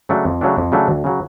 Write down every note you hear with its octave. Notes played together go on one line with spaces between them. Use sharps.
C#3 F#3 A3 D4
F2
C#3 F#3 A3 D4
F2
C#3 F#3 A3 D4
D2
C#3 F#3